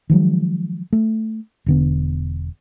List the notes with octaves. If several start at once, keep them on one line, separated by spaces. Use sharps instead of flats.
D#3 F3 F#3 G#3
A3
E1 D3 B3